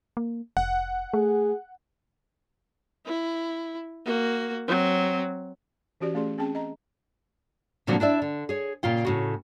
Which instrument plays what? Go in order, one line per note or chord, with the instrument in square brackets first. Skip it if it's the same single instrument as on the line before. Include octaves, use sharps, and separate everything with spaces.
[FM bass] A#3
[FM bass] F1 [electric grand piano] F#5
[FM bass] A3 [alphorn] G#4
[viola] E4
A#3 F#4
F#3 C4
[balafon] E3 C#4 F#4 G4 D5
A3 C#4 G#4 D5 C6
C4 C#4 G#4 G5 A5
D#5 A#5
[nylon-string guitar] A#2 D3 F3 F#3 A#3 C4
D4 E4 D5 E5
D3
G#4 C#5
A#2 C#3 F4 G5
A2 C#3 F#4